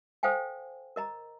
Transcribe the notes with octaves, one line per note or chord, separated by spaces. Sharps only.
A4 C5 F5 G5 G#5
A#4 D#5 A#5